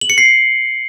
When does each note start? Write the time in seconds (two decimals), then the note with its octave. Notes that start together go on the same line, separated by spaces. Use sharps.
0.01 F#7
0.10 C#7
0.18 C7